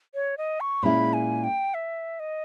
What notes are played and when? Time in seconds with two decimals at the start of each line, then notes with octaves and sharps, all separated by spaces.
0.15 C#5
0.38 D#5
0.60 C#6
0.83 A#2 G#3 C#4 E4 B5
1.13 G#5
1.44 G5
1.74 E5
2.20 D#5